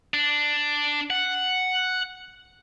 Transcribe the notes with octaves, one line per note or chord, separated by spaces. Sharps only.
D4
F#5